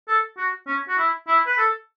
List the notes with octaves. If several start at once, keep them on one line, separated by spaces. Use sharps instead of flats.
A4
F#4
C#4
F#4
E4
E4
B4
A4